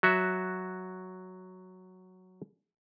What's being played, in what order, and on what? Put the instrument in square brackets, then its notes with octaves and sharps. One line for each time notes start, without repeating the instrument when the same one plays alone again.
[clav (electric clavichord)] F#3 F#4 E5